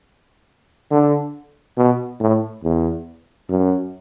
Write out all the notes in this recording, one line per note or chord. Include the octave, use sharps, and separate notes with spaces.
D3
B2
A2
E2
F#2